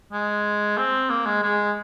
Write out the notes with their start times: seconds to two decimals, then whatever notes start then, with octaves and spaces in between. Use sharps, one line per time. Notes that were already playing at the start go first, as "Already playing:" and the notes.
0.13 G#3
0.78 C4
1.10 A#3
1.26 G#3
1.43 G#3